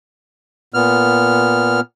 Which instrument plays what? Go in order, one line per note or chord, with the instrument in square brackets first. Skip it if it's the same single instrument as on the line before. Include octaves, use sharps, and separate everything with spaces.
[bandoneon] A#2 B3 F6